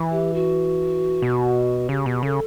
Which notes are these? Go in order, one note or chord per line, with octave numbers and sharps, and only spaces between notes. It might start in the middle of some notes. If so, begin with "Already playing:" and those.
Already playing: E3
G4
F#4
B2
C#3 G4
B2
C#3 A4